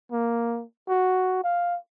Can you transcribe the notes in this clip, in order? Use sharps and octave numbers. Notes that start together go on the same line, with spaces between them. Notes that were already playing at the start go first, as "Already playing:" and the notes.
A#3
F#4
F5